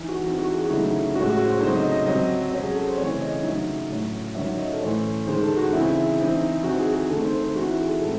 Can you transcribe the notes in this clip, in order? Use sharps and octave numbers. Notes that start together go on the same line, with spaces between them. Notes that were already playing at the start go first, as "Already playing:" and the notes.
Already playing: E3 D#4
F#4
E3 C4 D#4 F#4
F#4
G#4
F#4
C#3 F#3 A3 D#4 E4
A2 G#3 C#4 F#4
F#4
C5
C#3 F#3 A3 C4 D#4 C5
D#5
D#5
C3 F#3 C4 D#5
C3 F#3 C#4
G#4
A4
C5
C#3 E3 A3 C4 C#5
D#5
C#3 F#3 A3 D#4 E5
A2 F#3 C#4
D#3 F#3 C#4 E5
D#5
A4
A2 E3 A3 C#4 C5
D#3 G#3 D#4 C5
A4
F#4
C#3 E3 C4 D#4 E4
E3 C4 D#4
E3 C4 D#4 F#4
G#4
G#4
D#3 A3 C4 D#4 A4
C5
C5
E3 C4 D#4 F#4
E4
G#4
A4
A2 G#3 C4 A4